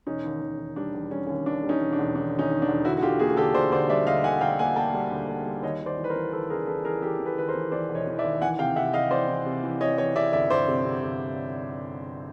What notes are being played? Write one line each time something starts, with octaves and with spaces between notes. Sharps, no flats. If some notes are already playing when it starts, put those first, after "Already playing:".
E1 C#4 D#4
D#2
D#2
D#3
G3 D4
E1
G3 C#4
D#2 C#4
D#2 D4
G3
C#4 D#4
E1
D4
E1
D#3 D4
D#2
C#4 D#4
D#3
D4
E1
D2 E4 F#4
F#4
D3 F4 G4
A#3 F#4 G#4
D3 G4 A4
D2 C5 D5
D2 C5 D5
G3 D5 E5
D2 D#5 F5
D3 F#5 G#5
D2 F5 G5
A#3 F#5 G#5
A#3 G5 A5
G3
D2
A#3
G3
D#2 C#5 D#5
D#2
C5 D5
E3
B4
A#4 C5
E3
D#2 A4 B4
C#3 G#4 A#4
E3 A4 B4
E3 G#4 A#4
E3 G4 A4
E3
A4 B4
D#2 B4
A#4 C5
E3
E3 C5 D5
E1
C#5 D#5
E3
D5 E5
D#2
E3 F#5 G#5
C3 F5 G5
C3 E5 F#5
C3 D#5 F5
E3 C5 D5
E3
C3
E3
E3 C#5 D#5
E3 C#5 D#5
C3 D5 E5
G1 D5 E5
G1 C5 D5
C3
C3
G1